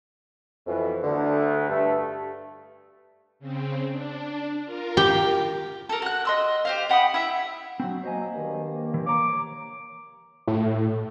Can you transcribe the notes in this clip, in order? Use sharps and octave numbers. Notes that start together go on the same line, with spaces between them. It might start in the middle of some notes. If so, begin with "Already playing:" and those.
F2 B2 E3
D2 D3
G2 A3
C#3 C4
D4
F4 A#4
G4
A4 A#4
F#4 F#6
D#5 C6 E6
G4 C5 F5
G4 F#5 B5 D#6
E4 E5
F#3 C4 F#4
F#3 A#3 C5 D#5 G#5
G2 D#3 A#3
E3 F3
C#5 A#5 D6
A2